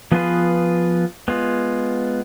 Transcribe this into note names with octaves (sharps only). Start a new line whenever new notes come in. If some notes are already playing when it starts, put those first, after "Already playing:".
F3 B3 F4 G#4 B4
G#3 B3 F4